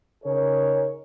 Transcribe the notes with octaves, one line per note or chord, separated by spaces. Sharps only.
C#3 D#4 G#4 A#4 C#5